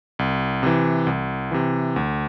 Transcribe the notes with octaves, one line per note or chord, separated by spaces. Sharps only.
C2
C3 E3
C2
C3 E3
D2